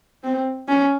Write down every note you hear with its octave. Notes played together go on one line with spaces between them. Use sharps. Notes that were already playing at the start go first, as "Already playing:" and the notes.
C4
C#4